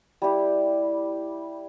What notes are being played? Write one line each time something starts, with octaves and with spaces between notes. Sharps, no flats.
G3 E4 G4